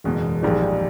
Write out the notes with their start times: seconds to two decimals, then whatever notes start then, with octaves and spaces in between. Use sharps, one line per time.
0.04 F#1 E2 B2 G#3
0.43 A#1 G#2 D#3 G3